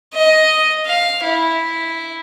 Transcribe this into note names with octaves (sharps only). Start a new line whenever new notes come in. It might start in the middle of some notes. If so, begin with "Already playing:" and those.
D#5
F5
E4